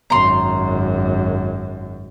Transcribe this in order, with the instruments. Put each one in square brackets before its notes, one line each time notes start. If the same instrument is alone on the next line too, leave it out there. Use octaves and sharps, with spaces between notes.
[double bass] G#1 F#2 [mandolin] A#5 C6